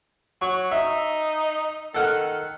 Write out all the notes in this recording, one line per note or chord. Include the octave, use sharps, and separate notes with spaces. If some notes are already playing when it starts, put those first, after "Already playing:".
F#3 C#6
D#4 E5
D#3 A4 F#5 F6